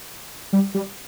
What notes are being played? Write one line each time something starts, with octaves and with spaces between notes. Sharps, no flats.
G3
G3